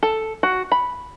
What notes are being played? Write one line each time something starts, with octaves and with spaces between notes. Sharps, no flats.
A4
F#4
B5